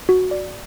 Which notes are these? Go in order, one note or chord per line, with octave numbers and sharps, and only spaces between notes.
F#4
D5